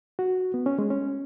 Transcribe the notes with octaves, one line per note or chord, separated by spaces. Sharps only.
F#4
B3
C#4
G#3
C#4